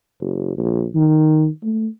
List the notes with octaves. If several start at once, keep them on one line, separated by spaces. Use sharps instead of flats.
F#1
A#1
D#3
A3